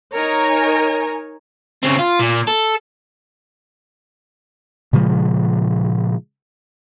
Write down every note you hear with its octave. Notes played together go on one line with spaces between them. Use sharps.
D#4 A#4 C#5 G#5 A#5
C#3 C4
F4
A#2
A4
A#2 C#3 F3 G#3